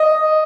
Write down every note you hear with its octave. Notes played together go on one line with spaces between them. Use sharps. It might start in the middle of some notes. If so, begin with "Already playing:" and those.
Already playing: D#5